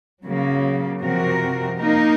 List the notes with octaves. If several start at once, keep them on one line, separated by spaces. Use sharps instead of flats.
C#3 F#3 A#3
C3 F3 C4 F#4 A#4
A#3 D#4 A#4